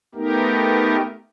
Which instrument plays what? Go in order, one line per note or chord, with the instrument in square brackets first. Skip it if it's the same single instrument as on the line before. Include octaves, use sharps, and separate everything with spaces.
[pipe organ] A3 B3 D#4 G4 A#4